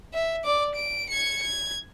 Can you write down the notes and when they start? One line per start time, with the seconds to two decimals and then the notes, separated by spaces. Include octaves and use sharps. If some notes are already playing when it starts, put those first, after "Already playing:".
0.14 E5
0.44 D5 D6
0.75 D7
1.10 G#6 C#7
1.42 G#6